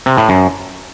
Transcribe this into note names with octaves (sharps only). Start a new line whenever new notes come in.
C3
A2
F#2